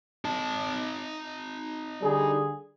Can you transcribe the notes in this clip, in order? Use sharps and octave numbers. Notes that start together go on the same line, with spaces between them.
D#4 A5
D3 G3 G#4